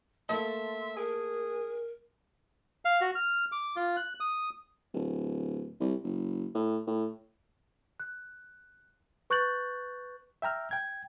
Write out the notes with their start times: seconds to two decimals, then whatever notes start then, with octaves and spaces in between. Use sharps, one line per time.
0.29 A3 A#3 E5 A5 C6
0.96 G#4 A#4
2.85 F5
3.01 F#4
3.15 F6
3.52 D6
3.76 F4
3.97 F#6
4.20 D#6
4.94 D1
5.80 C2
6.04 F#1
6.55 A2
6.87 A2
8.00 F#6
9.30 B4 C#6 F#6 G6 A6 F#7
10.42 E5 G5 A#5 F6
10.71 G5 G#6